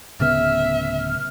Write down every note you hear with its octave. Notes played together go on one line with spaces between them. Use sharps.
D1 C#3 B3 E5 F6